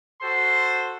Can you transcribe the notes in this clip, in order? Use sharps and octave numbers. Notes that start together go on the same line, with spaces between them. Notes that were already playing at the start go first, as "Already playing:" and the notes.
F#4 A4 C5 C6